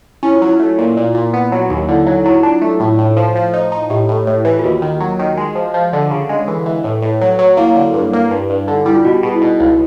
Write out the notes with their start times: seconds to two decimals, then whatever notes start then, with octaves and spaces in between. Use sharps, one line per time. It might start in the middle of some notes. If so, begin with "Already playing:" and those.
0.23 C#4 E4
0.34 F4
0.42 F#3
0.47 E4
0.59 A3
0.79 A#2
0.97 A#2
1.15 A#2
1.33 B3
1.52 F#3
1.70 D#2 D#4
1.89 D3 E4
2.07 F#3 D#4
2.25 F#3 E4
2.43 D4 F4
2.62 A3
2.80 A2
2.98 A2
3.17 F3
3.35 F3
3.54 D#4
3.72 D#4
3.90 A2 G4
4.09 A2
4.27 A2
4.45 E3
4.59 F4
4.64 D#2 F#4
4.82 D#3
5.00 F#3
5.19 D#3
5.38 G#3
5.55 F3
5.74 F3
5.93 D3
6.11 C#3
6.29 G#3
6.48 E3
6.66 E3
6.84 A2
7.02 A2
7.21 F#3
7.39 F#3
7.57 A#3 E4
7.76 D3
7.94 G2
8.13 A#3
8.31 G2
8.50 G2
8.68 D3
8.76 D#4
8.85 G3 E4
8.95 F4
9.05 B2 F#4
9.23 B2 G#4
9.34 E4
9.42 B2 D#4
9.60 C#2 E4